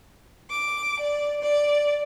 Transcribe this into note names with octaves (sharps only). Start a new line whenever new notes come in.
D6
D5
D5